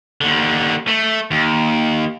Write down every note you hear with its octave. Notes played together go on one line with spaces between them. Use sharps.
D#2 D3
A3
D#2